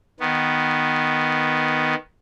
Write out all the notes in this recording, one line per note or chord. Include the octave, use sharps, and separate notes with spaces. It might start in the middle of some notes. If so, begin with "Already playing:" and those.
D#3 B3